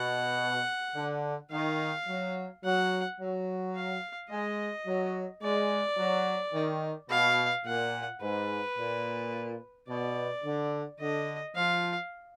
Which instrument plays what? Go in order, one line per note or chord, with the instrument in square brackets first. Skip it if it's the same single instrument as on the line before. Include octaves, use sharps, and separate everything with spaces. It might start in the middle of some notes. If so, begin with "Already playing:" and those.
Already playing: [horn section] B2 [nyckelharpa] F#5
[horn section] D3
[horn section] D#3 [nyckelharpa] F5
[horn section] F#3
[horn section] F#3 [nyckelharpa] F#5
[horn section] F#3
[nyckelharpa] F5
[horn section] G#3 [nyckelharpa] D#5
[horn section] F#3
[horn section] G#3 [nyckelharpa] D5
[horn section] F#3
D#3
[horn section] B2 [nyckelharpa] F5
[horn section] A#2 [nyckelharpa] F#5
[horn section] G#2 [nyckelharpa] B4
[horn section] A#2
[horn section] B2 [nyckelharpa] D5
[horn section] D3
[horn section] D3 [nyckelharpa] D#5
[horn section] F3 [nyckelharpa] F5